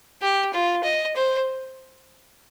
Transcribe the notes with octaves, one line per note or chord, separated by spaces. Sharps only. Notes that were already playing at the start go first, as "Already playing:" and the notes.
G4
F4
D#5
C5